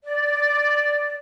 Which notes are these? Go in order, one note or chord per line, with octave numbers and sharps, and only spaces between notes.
D5